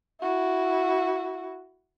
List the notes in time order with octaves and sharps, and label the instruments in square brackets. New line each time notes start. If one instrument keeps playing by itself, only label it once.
[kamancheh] E4 F#4